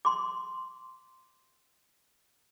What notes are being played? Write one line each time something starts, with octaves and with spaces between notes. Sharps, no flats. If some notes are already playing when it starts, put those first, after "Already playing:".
C6 D6